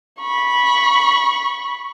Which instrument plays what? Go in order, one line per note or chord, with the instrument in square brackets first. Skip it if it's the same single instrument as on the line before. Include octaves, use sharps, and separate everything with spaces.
[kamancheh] B5 C#6